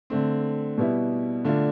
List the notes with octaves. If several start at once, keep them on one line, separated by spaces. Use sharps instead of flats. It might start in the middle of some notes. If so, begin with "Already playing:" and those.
D3 A3 C4
B2 G3 B3 E4
D3 A3 D4 F4